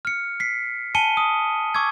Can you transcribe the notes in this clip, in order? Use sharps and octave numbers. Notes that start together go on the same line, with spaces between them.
F6 C#7
B6 C7
G#5 A5 C#7 D#7 G7
D#6
C#6 D6 E6 G#6